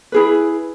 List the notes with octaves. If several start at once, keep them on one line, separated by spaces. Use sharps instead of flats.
E4 G#4 B4